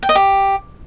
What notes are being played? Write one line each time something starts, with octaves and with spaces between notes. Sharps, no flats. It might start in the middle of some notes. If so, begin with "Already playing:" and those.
G5
D#5
G4